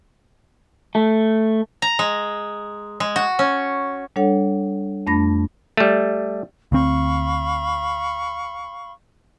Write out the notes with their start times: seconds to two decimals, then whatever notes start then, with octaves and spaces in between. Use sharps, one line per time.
0.95 A3
1.82 A#5
1.99 G#3
3.00 G#3
3.16 F#4
3.39 C#4
4.16 G3 D4 A4 C#5 F#5
5.07 F2 A3 D4 B5 A#6
5.77 G3 A3
6.72 D2 C4 F5 B5 C#6